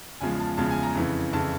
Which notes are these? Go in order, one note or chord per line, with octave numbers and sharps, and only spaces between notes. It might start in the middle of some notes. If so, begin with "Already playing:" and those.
E2 C#3 F3 G#3 G#5
A5
E2 C#3 F3 G#3 A5
G#5
A#5
F2 C#3 E3
F2 C#3 E3 A5